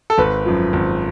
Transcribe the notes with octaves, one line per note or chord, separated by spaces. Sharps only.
A4
G#1 B4
F#2 F3
G#1